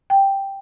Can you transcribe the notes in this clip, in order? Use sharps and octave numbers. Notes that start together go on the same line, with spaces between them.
G5